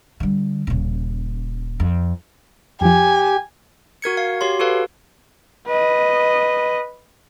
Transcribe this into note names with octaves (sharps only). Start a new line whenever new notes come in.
D3 G3
D#1 C#3
F2
F2 F3 G4 G#5
F#4 A#4 G#6 C#7
F5
F#4 G4 C#5 C6
F#4 A4 B4 F5
B4 D#5